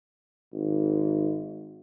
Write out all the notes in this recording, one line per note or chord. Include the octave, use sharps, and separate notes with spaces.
G#1